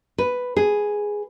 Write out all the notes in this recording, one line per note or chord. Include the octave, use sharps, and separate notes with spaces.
B4
G#4